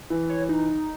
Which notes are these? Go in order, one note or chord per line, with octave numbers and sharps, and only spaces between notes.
E3
C#5
D#4